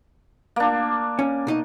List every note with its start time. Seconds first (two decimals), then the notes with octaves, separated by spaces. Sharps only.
0.56 A#3 D4
1.19 C#4
1.47 B2 D#4 D#5